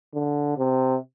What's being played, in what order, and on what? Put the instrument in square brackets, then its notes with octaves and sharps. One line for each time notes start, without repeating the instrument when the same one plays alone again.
[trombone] D3
C3